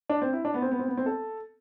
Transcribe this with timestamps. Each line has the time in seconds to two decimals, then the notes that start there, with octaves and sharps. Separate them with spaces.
0.10 D4
0.22 C4
0.33 E4
0.45 D4
0.54 B3
0.62 C4
0.71 B3
0.79 C4
0.88 B3
0.97 C4
1.06 A4